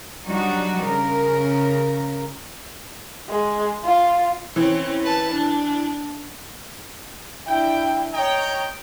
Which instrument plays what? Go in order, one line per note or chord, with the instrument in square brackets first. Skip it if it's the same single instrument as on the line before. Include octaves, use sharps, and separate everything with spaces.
[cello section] F#3 G3 D4 D#4 F#4
C#3 A#4
[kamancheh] G#3
F4
[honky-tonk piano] E3 [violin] C4 C#4
[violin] B4 A5
D4
[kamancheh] D4 E4 [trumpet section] G5
[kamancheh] C#5 A#5 [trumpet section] D#5 G5